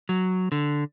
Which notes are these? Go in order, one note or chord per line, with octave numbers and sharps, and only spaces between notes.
F#3
D3